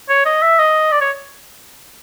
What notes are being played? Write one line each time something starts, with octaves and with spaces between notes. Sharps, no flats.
C#5
D#5
E5
D#5
D5
C#5